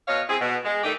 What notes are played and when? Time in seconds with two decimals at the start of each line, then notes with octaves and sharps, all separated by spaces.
0.07 B2 C#5 D#5 F5
0.28 C4 E4 G#4
0.40 B2
0.65 G#3
0.83 D#3 G3 A3 D#4 G4